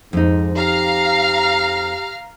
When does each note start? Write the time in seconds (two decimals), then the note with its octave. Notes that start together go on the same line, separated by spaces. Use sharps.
0.13 F2 G#2 D#4
0.56 G4 F5 A#5 F6